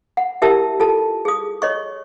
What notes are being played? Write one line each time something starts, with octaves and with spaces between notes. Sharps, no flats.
F#5
E4 G4 A#4 E5 A5 E6
F4 A4 A5
G#4 D#6
C#5 D#5 C#6